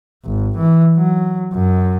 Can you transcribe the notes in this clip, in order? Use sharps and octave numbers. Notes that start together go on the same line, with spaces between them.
G#1
E3
F#3
F#2